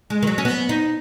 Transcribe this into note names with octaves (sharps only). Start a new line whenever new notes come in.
G#3
D#3
F#3
C#4
B3
D#4